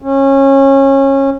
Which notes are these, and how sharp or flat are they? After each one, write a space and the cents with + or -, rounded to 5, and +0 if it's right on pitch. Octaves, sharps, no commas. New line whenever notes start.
C#4 -25